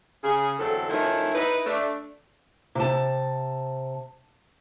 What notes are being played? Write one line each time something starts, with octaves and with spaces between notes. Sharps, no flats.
C#3 G#4
E2 D3 F#3 C4 A4
D#3 F3 A3 C#4 D#4 E4
D#4 E4 B4
A3 D4
C3 A5